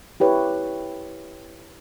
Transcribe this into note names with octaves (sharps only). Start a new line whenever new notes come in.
E4 G4 B4 C#5